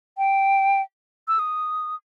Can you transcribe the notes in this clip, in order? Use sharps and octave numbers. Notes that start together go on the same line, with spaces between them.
G5
E6
D#6